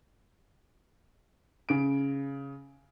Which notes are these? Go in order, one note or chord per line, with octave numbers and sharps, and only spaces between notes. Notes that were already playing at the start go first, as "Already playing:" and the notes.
C#3 D7